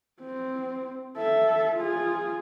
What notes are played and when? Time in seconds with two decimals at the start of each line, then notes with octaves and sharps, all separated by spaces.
0.21 C4
1.17 A4 E5
1.77 F4 G#4